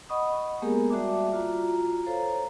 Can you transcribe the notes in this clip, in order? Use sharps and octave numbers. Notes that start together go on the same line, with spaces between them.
D#5 F#5 B5 C#6 D#6
G#3 A#3 B3 G4 G#4 A#4
G3 F#4 D5 E5 A5 D6
F4 F#4 A#5
A4 C5 C#5 F5 A#5